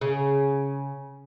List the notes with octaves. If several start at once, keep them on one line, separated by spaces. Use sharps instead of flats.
C#3